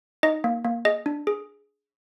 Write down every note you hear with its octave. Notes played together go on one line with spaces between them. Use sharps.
D#4 D#5
A#3
A#3
G#4 D#5
D4
G#4